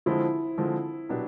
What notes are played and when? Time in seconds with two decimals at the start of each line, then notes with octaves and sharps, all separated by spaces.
0.06 D3 F3 G#3 C4 E4 F4
0.58 D3 F3 G#3 C4 F4
1.09 B2 F#3 B3 D4 G4